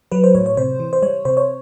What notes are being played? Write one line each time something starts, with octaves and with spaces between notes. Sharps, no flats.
F#3 B4
C5
A2 C#5
C#5
C3 C5
E3
C5
G3 C#5
C3 C5
C#5